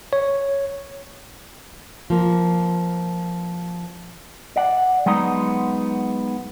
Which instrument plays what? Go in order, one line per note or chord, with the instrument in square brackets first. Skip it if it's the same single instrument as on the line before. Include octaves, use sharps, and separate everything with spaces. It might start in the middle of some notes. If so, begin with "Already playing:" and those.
[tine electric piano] C#5
[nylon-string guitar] F3 A#3
[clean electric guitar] D5 F#5
F#3 G#3 B3 D#4 A#5